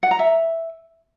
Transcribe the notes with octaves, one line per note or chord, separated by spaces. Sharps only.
F#5
A#5
E5